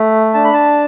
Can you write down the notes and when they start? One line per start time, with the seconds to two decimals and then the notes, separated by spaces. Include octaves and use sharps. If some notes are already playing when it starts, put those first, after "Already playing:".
Already playing: A3
0.34 D4 A5
0.44 B5
0.53 A5